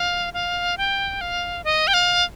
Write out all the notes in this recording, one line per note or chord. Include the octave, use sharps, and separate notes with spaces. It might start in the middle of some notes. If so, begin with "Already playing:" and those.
Already playing: F5
F5
G5
F5
D#5
G5
F5